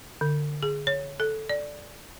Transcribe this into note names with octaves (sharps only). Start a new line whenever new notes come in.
D3
G#4
C#5
A4
D5